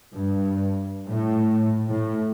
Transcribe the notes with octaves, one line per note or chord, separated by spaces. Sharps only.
G2
A2
A2